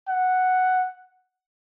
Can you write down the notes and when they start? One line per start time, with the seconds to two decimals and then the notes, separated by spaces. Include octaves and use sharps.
0.08 F#5